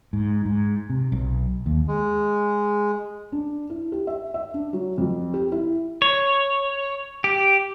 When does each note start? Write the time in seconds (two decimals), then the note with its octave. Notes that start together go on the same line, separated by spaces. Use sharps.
0.13 G#2
0.46 G#2
0.90 C3
1.12 B1
1.66 D#2
1.88 G#3
3.32 D4
3.70 E4
3.92 G4
4.07 E5
4.34 E5
4.54 D4
4.73 F#3
4.98 F2
5.34 G4
5.52 E4
6.02 C#5
7.24 G4